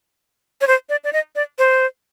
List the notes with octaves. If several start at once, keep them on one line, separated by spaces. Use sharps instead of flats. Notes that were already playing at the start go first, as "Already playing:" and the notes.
C#5
C5
D5
D5
D#5
D5
C5